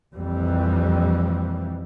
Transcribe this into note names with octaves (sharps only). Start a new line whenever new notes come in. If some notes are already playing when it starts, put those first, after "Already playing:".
A#1 F2 E3 G3